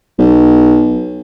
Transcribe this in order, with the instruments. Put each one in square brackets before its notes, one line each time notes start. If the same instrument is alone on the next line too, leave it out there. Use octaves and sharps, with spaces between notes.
[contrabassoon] B1